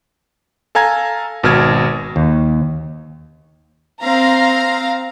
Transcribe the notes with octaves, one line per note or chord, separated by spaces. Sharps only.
A4 F5 G#5 A#5 G#6
G#1 B2 F6 G#6
D#2
C4 F5 A#5